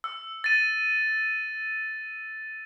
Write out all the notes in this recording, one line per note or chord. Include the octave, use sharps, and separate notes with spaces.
E6
A6 D#7